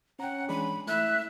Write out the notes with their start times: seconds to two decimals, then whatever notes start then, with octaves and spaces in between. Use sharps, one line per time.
0.20 C#4 F#5 G5 A#5
0.49 E3 G#3 D4 B5
0.87 A3 E4 E5 F#6